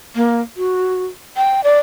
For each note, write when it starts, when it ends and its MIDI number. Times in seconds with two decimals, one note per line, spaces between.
0.15 0.41 58
0.57 1.06 66
1.37 1.64 79
1.64 1.79 74